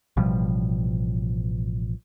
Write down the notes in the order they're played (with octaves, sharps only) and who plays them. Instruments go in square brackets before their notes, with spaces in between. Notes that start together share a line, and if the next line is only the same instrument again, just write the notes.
[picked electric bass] A1 B2 F3 G3